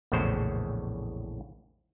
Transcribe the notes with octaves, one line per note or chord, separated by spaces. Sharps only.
A#1 E2 A2 C#3 C5